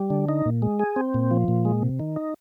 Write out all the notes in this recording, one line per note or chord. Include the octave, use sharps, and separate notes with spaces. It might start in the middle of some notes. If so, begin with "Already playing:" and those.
Already playing: G3
D3
D#4
A#2
G#3
G#4
C4
A#2
F3
A#2
G#3
C3
D#3
D#4